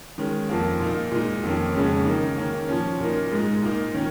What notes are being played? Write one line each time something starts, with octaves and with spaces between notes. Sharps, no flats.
D#3 G#3 C#4
F2 F3 A#3
A#2 A#3 D#4
A#2 G#3 D#4
F2 D#3 A#3 C#4
F2 C#3 G#3 C#4
D#3 A#3 D#4
D#3 A#3 C#4
A#2 F3 C#4
A#2 A#3 D#4
G#2 G#3 D#4
A#2 A#3 D#4
D#3 C#4